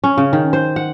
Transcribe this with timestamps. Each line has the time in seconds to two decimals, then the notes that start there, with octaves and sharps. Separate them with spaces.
0.04 C#4
0.17 C#3
0.33 D#3
0.53 C5
0.76 F#5